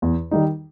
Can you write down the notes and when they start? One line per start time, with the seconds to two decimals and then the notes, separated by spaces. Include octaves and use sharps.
0.02 E2
0.31 D#3 G3 D#4